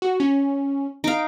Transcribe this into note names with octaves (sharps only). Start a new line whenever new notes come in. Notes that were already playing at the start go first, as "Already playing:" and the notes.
F#4
C#4
D#4 F5 D7